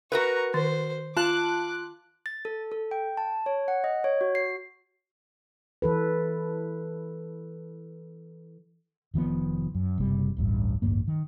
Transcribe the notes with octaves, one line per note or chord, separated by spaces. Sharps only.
F#4 A#4 B4 A#5 C#6
D#3 C5
F4 A5 D6 F#6
A6
A4
A4
G5
A5
C#5
F#5
D#5
C#5
F#4
C7
E3 A4 B4
F1 D#3 F3 B3
F#2
F#1 C3 G3
D1 A1 G2
A1 D2 G2 A#3
D#3